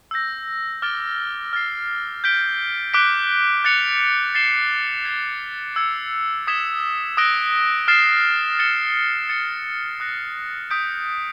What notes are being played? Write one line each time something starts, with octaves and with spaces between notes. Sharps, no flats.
E6 G6 A#6
D6 F6 A6 D7 G7
F6 A6 C7
G6 B6 D7 G7
D6 F#6 B6 D7 G7
F#6 A6 C#7 F7
A6 C7 E7 G7
G#6 C7 E7 G7
E6 G#6 C#7 F7
D#6 G#6 B6 E7 G7
D#6 F#6 A#6 D7 G7
F6 A6 C7 E7
A6 C#7 E7 G7
A6 C#7 E7
D#6 F#6 A#6
D#6 G6 B6 D7